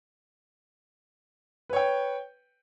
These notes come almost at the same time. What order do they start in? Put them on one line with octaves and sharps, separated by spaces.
B4 C#5 G5